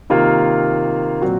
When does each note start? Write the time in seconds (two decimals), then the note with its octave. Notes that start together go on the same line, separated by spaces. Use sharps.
0.10 C3 D#3 A#3 F4
1.22 A#2 F#3 C4 F#4